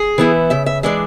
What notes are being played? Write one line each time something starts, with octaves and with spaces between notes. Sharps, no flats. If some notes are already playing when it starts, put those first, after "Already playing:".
Already playing: G#4
E3 B3 E4
C#3 E5
E5
E3 G#3 D4 D5